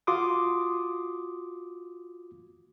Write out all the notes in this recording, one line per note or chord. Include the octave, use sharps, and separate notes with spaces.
F4 F#4 C6 D6 D#6